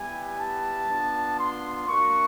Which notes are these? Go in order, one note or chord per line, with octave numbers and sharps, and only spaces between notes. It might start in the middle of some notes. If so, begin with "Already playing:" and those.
Already playing: G3 B3 E4 G4 G#5
A5
B3 D4 F4
C6
A#3 D4 F#4 C#6